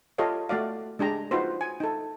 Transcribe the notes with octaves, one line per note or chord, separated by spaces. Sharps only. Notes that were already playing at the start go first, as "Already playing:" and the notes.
F4 G4 A4 C#5 D#5 F5
A3 F#4 D5 F5
G#3 D4 G4 A#5
D#4 F4 F#4 B4 C5
G#5
D#4 A4